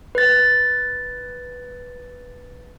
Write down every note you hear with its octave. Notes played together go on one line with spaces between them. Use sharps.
B4 A6